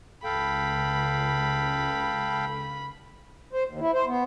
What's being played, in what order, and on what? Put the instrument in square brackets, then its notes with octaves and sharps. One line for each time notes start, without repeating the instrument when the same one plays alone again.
[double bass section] C#2 [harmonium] A4 F5 G5 [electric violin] B5
[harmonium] C5
D#2
E4
C5
B3